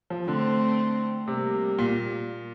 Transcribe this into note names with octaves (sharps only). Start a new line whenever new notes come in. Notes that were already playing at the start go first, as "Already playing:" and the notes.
F3
D3 A3 C4
C3 G3 A#3
A#2